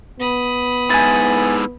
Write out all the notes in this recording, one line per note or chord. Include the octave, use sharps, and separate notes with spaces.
B3 B5 D#6
G#2 E4 G#5 A6